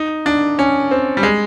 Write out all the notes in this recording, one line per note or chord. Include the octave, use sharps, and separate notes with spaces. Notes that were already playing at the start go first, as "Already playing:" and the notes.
Already playing: D#4
D4
C#4
C4
G3
G#3